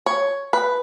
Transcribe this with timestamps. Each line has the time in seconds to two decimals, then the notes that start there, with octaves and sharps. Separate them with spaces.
0.06 C#5
0.53 B4